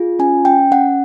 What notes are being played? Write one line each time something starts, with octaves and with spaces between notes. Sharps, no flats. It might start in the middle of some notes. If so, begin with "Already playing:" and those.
Already playing: F4 G#4
C#4 G#5
C#4 G5
C#4 F#5